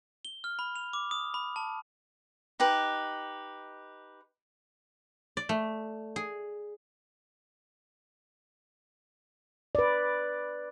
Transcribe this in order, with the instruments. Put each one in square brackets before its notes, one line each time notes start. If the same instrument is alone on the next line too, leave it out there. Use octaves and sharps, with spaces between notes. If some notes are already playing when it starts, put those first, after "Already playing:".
[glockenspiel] G7
F6
B5
F7
D6
D#6
B5
A5
[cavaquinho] D#4 G4 B4
[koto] D5
A3
G#4
[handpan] B4 D5